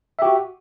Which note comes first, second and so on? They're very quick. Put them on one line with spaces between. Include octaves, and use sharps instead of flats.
E5 G4 F#4